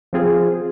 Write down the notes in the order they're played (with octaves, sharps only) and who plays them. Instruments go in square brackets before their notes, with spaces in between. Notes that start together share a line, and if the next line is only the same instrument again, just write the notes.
[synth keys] F3 C4 F4 G#4